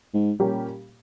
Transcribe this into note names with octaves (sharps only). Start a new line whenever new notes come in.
G#2
A#2 G3 C#4 G4 A#4